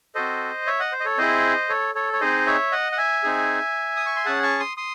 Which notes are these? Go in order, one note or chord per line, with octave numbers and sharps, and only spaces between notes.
C4 F#4 A4 C5 D#5
C#5 E5
D#5 F#5
C5
D#5
A4 C#5
C4 E4 G#4 C5 D#5
A4 C#5
A4 C#5
C#5
C4 D#4 G#4 C5 D#5
C#5 E5
D#5 F#5
F#5
E5 G#5
C4 D#4 G#4
D#6
C#6
C6
C#4 G#4 F#5 A5
A5 C#6
C6 D#6
C6 D#6